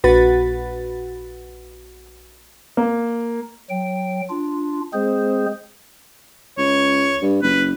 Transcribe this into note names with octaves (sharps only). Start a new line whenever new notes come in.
A#1 F#4 B4 B5 A6
A#3
F#3 G5
D4 F4
G#3 C4 G#4 C5
C#2 C#5
G2
F#1 B4